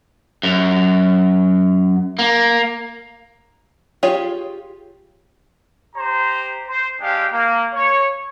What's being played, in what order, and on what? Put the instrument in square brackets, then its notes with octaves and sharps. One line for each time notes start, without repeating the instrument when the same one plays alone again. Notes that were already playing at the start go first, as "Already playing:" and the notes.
[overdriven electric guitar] F#2
A#3
[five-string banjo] F4 G4 G#4 C#5 G5
[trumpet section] G4 C5 A#5
C5
G#3 D4 G4 F5 G5
A#3
C#5